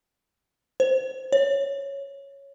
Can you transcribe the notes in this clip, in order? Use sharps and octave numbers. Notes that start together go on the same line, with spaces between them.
C5
C#5